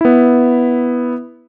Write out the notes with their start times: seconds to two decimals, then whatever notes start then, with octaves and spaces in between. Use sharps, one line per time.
0.01 B3 E4